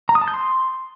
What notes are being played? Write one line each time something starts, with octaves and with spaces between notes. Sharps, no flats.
A#5
D#6
A5
G6
C6